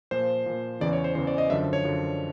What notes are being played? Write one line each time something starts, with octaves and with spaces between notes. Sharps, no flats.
A#2 F3 C5
A#2 F3
E2 C#3 E3 D5
C#5
C5
E2 C#3 E3 C5
D5
D#5
F#2 D3 F3 E5
C#5
F#2 D3 F3